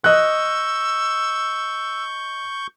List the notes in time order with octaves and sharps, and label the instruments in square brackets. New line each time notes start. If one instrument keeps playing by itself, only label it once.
[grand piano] D#5 F#6 [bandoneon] C#6 G6 [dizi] E6